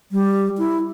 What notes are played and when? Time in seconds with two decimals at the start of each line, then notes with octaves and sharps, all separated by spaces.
0.12 G3
0.58 E4